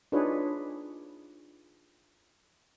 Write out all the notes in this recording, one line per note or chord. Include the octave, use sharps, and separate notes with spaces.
D4 D#4 F4 G#4 B4 C#5